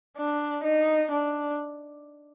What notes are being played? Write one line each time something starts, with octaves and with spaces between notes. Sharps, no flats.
D4
D#4
D4